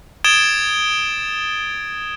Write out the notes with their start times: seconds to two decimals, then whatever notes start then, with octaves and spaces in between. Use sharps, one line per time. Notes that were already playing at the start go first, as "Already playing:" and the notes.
0.24 D#6 G#6 A6 D7 E7 G7